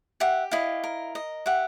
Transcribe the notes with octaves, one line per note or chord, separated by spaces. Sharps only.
G4 E5 F#5
E4 D#5 F5
A#4
D#5
G4 E5 F#5